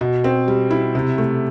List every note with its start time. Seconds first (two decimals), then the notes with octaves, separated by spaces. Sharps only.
0.01 B2
0.24 C4
0.48 G3
0.70 E4
0.95 C3
1.18 A3